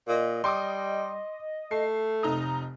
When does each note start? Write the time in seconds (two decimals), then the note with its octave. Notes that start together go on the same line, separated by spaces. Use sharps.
0.08 A#2 D#5
0.44 G3 C6 D6 D#6
1.71 A3 C7
2.23 F1 D#4 A#5 D#6